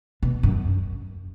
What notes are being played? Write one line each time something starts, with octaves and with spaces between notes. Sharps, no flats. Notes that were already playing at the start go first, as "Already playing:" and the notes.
B2
F#2